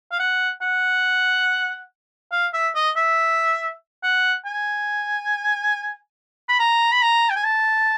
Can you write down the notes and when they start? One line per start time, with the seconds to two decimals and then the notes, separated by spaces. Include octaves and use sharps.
0.12 F5
0.20 F#5
0.62 F#5
2.32 F5
2.54 E5
2.75 D#5
2.97 E5
4.03 F#5
4.46 G#5
6.49 B5
6.60 A#5
6.92 B5
7.02 A#5
7.30 G5
7.36 G#5
7.44 A5